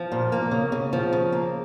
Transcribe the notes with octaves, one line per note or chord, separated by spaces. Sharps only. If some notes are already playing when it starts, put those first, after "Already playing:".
Already playing: F3
A#2
A#3
C#3
C#3
F3
C#3
A#3